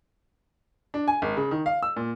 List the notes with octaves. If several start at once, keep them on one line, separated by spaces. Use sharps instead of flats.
D4
G#5
G#1
C#3
D#3
F5
E6
A#2